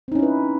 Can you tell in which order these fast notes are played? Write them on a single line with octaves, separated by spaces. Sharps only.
C4 D#4 C#4 E4 B4